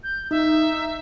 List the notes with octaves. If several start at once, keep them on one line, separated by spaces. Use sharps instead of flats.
G6
D#4 E5